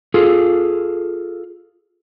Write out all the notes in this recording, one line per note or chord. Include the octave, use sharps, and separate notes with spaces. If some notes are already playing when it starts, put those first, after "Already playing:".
F4 G#4 A4